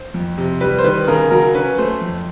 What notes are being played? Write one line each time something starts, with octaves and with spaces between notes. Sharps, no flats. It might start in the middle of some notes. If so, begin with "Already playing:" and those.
Already playing: C5
F2
C3
G3 B4
C5
D#3 B4
C#3 A#4
F#3 A#4
C#4 B4
A3 C5
F2